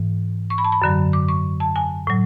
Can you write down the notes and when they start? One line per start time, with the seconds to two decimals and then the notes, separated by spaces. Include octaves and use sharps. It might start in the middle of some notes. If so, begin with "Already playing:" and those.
Already playing: G#2 E3
0.50 C#6
0.58 B5
0.64 A5
0.72 B5
0.82 F#2 D3 F#3
1.13 D6
1.28 C#6
1.60 A5
1.76 G#5
2.07 A2 F#3